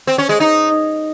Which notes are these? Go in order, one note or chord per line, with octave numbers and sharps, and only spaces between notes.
C4
C#4
G#3
D#4